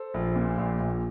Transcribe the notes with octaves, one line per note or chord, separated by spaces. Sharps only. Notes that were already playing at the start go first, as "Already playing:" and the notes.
Already playing: A4 C5
A#1
A#2
A#1
A#1